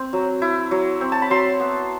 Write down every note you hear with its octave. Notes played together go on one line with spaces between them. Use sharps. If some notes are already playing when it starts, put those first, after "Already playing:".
Already playing: C4
F#3
E4
F#3
C4
A5
B5
F#3 C6
B3